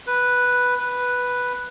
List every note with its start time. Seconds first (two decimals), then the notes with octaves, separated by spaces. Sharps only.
0.07 B4
0.79 B4